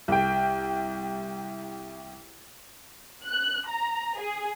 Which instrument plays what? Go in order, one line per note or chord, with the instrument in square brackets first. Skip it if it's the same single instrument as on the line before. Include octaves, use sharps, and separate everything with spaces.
[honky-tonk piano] C2 G5
[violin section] F#6
A#5
G#4